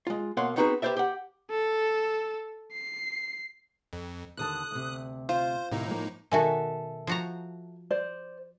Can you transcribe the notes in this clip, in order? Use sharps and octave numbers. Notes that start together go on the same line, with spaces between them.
G#3 F4
B2 A#3 C#5 F5 F#5 C6
B3 C4 D#4 F#4 G#4 B4
G4 B4 C5 D5 E5
G4 F#5
A4
C7
F2
D#2 D3 A5 D#6 F#6
D2 C3
F4 C5
A2 C3 D#3 D#4
F3 A#3
B2 D#3 F#4 A4 E5 G#5
F3 F#4 A#5
C5 D5